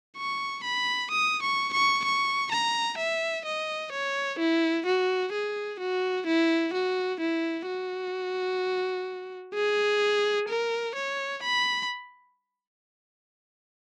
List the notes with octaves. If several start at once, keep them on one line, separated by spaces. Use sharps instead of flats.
C#6
B5
D#6
C#6
C#6
C#6
A#5
E5
D#5
C#5
E4
F#4
G#4
F#4
E4
F#4
E4
F#4
G#4
A#4
C#5
B5